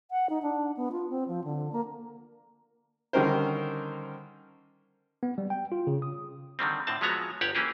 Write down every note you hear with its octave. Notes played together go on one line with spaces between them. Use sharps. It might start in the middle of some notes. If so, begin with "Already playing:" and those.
F#5
D#4
D4
B3
F4
C4
F3
D3
A#3
D3 D#3 G3 C#4 A#4 C5
B3
G3
G5
F4
C#3
D#6
D3 D#3 G3 C4
A2 D3 C4 A5
F3 F#3 G#3 B3 C#5 A#5
G1 G4 C#5 F#5
E3 A#3 C#4 G4 G#4